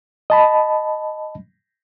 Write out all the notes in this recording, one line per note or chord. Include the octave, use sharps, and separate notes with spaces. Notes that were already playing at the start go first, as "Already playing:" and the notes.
D#5 A5 B5